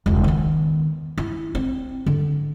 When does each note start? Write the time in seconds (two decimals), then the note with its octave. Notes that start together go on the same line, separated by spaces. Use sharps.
0.06 E1 C#2
0.24 D#3 B3
1.18 E4
1.55 C4
2.06 D3